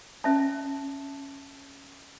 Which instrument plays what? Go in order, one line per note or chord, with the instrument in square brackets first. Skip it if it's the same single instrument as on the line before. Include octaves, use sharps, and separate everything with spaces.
[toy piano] C#4 E5 A5